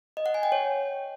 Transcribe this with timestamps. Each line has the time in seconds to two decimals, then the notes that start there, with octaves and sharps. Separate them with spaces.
0.17 D#5
0.26 F#5
0.34 G#5
0.43 G5
0.52 C#5